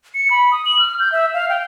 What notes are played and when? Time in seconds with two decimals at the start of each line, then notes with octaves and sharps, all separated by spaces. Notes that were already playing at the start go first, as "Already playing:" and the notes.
0.14 C#7
0.30 B5
0.51 D#6
0.65 F#7
0.79 F6
0.99 G6
1.12 E5
1.34 F5
1.49 G5